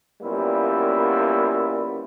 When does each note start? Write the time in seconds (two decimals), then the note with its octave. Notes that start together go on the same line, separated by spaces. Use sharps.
0.22 F#2 G3 A#3 B3 E4 F4